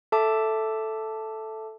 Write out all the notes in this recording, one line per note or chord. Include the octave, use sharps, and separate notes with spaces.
A4 E5 A5 D6